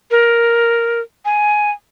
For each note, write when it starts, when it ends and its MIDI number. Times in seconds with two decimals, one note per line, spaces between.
0.11 1.00 70
1.25 1.71 80